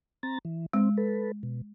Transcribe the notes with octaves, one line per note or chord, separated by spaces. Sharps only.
C4 A#5 A6
E3
G#3 C4
A4 B4
B2